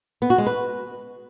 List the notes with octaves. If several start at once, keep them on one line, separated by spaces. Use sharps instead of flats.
B3
F#4
G#3
B4